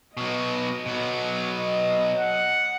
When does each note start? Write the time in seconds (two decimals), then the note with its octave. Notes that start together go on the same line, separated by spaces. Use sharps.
0.17 B2 F#3 D#5
0.86 B2 F#3
1.49 D#5
2.19 F#5